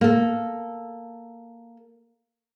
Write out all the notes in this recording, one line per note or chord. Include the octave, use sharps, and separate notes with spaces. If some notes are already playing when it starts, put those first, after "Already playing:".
A#3 A4